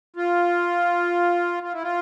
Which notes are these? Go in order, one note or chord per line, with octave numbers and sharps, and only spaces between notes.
F4
F4
E4
F4